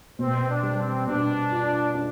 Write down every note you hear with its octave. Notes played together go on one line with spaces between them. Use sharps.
B2 C4
D4
G3
C4
B2 D4
F4
D4